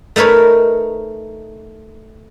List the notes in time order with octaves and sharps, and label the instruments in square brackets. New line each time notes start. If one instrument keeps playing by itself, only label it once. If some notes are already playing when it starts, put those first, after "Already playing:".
[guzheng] A3 D#4 A#4 B4 C#5